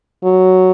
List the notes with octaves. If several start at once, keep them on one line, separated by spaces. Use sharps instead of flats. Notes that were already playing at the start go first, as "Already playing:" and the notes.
F#3